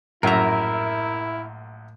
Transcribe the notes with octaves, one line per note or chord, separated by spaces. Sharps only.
A#1 F#2 A2 E4 A#4 E5 A#5